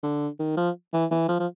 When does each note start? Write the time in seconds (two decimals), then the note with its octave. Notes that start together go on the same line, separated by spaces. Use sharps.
0.03 D3
0.39 D#3
0.57 F3
0.93 E3
1.11 E3
1.28 F3
1.40 F3